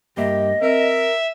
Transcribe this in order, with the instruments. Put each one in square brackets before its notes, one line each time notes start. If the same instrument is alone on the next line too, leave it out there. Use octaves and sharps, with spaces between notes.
[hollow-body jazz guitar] G2 A#3 E5 [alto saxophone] G4 [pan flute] D#5
[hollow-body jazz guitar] C4 [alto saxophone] A#4 [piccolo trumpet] E5